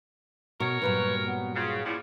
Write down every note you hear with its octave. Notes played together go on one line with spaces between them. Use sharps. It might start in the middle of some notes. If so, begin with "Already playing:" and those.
B2 A#4 C#5
G2 A#2 F#3 B4
B3
C#3 F4
C#3 F3 G3 E4